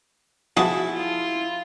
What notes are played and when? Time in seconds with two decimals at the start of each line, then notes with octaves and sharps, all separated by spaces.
0.57 F3 E4 F#4 G#4 A5
0.93 F4